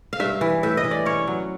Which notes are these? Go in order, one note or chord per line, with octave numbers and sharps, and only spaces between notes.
F5
G2 E5
E3
A2 E5
D#5
E3
D5
C#4 C#5
F#3